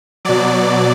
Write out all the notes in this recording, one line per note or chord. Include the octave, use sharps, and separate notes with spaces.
B2 F#3 D5